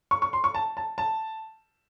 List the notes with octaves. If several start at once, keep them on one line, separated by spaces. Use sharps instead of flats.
C#6
C#6
C6
C#6
A5
A5
A5